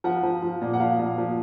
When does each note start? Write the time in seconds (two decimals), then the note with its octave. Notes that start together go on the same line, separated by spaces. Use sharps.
0.04 F3 F#5
0.23 F3
0.42 F3
0.62 A#2
0.73 F#5
0.80 F3 F5
0.99 A#2
1.18 F3